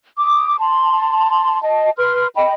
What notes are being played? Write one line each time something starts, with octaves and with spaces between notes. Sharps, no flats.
D6 D#6
A5 C6
D#5 A5
B4 C6 F6
D#5 G5 B5